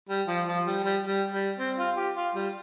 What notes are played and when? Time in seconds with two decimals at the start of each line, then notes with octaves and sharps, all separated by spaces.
0.09 G3
0.27 F3
0.47 F3
0.66 G3
0.84 G3
1.03 G3
1.31 G3
1.59 C4
1.78 F4
1.97 G4
2.16 F4
2.35 G3